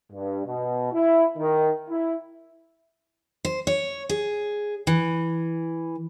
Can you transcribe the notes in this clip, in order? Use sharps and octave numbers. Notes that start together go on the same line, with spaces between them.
G2
B2
E4
D#3
E4
C5
C#5
G#4
E3